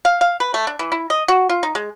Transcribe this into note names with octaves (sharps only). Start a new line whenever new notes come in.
F5
F5
B4
A3
D4
E3
E4
D#5
F#4
F4
D#4
G#3